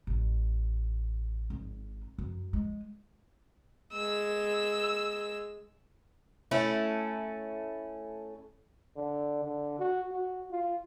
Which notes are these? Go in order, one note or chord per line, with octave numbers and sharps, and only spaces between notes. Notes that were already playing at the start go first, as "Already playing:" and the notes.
A1
G#1
F#2
G#3
G#3 E6
A3 C#4 E4 A4
D3
D3
F#4
F#4
F4